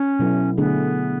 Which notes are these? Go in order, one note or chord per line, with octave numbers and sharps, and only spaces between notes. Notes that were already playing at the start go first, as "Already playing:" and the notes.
Already playing: C#4
B2 F#3 B3 E4 A4
D3 A3 B3 D4 G#4